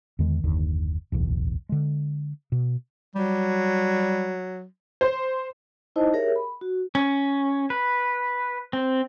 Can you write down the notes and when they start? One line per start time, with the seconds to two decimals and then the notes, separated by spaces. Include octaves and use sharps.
0.19 E2 D3 D#3 G#3
0.44 F#1 D#2 D3
1.12 D1 B1 E2
1.69 D3 G#3
2.52 B2
3.15 F#3 G3
5.01 C5
5.96 D#4 E4 C5 D#5 A5
6.13 G4 G#4 A#4 C#5 E5
6.36 B5
6.61 F#4
6.95 C#4
7.70 B4
8.73 C4